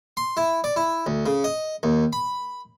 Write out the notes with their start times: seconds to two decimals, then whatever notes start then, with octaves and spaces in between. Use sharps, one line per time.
0.17 C6
0.37 E4
0.64 D5
0.76 E4
1.06 D2
1.26 C#3
1.44 D#5
1.83 D#2
2.13 B5